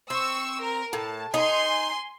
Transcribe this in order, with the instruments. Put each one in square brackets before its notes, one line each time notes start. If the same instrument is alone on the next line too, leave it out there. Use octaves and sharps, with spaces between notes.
[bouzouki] C4 [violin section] C#6 E6
[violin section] A#4
[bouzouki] A2 [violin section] A5
[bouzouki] D#4 [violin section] G#5 C6